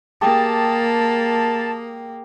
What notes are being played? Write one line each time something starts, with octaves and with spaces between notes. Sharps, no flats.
A#3 G4 G#4 A5